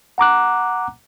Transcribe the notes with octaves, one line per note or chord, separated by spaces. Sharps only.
F#5 A#5 D6 F#6